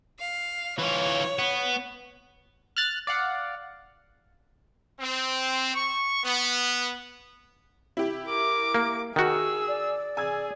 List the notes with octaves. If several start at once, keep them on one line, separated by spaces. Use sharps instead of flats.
F5
E3 F4 C#5
B3
F6 F#6 A6
D5 F5 F#5
C4
C#6
B3
E4 G4
A#4 D6
A#3
D#3 F#4 G#4 E6
D5
G#4 G#5 E6 G#6